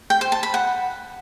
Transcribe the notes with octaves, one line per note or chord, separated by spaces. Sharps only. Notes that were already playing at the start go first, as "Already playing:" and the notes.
G5
C5
A5
B5
F#5